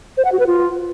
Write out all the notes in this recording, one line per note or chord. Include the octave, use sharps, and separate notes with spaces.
C5
F#5
F#4
B4
F4